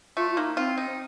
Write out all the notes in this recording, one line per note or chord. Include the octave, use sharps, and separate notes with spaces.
A3 F4
F4
A#3 D#4
C4 F4
D#4